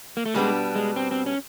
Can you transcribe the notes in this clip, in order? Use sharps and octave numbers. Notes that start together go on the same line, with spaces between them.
A#3
A3
B2 G3 G#3 B3 D4
G#3
C4
C4
C#4